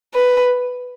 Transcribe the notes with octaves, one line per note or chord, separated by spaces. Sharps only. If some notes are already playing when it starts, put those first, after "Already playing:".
B4